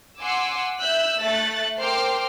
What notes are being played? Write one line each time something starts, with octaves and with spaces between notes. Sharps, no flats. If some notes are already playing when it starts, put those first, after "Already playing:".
F#5 G#5 C6 D6 E6
E5 E6 F#6 G6
A3 E5 F#6 A6
A#4 C5 G5 C6 D6 F6